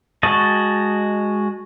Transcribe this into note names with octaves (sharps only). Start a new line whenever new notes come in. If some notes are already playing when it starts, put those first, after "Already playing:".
G#3 F#4 D#5 A5